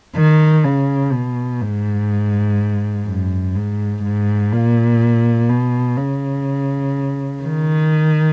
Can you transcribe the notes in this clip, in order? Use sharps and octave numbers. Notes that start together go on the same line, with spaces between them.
D#3
C#3
B2
G#2
F#2
G#2
G#2
A#2
B2
C#3
D#3